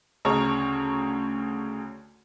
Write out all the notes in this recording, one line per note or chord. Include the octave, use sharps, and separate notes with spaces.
D2 C#3 C#5 A5 A#5 F6